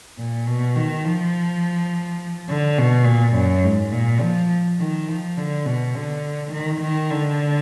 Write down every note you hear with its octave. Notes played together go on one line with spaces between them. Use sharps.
A#2
B2
D#3
F3
D3
B2
A#2
F#2
G#2
A#2
F3
D#3
F3
D3
B2
D3
D#3
D#3
D3